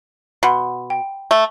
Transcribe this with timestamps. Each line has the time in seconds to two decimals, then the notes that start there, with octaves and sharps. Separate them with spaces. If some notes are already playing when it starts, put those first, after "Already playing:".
0.43 B2 F#5 B5 C6
0.90 G5
1.31 A3